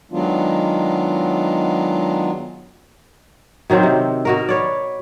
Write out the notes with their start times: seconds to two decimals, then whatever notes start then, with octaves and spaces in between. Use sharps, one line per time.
0.12 D#3 F#3 G#3 B3 D4 F4
3.70 B2 D#3 F#3 C4
3.83 C3
4.25 B2 F#4 A#4
4.49 B4 C#5 D5